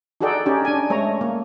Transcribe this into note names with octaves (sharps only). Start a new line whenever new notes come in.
D#4 F#4 G#4 A4 D5 G5
C#4 D#4 G4
D4 G#5
G#3 A3 C#5 A#5
A#3